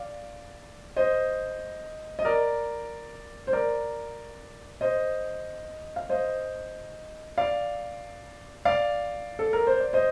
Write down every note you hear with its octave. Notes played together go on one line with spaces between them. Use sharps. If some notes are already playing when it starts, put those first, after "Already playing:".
Already playing: D5 F5
C5 D#5
D#5
A#4 D5
C5
A#4 D5
C5 D#5
F5
C5 D#5
D5 F5
D5 F5
A4
A#4
C5
D5
C5 D#5